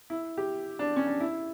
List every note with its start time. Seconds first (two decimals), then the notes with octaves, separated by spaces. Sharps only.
0.10 E4
0.37 G4
0.79 D4
0.96 C#4
1.07 D4
1.20 E4